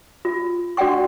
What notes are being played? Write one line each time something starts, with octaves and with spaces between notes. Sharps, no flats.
F4
D4 F#4 D5 F#5 G5 C#6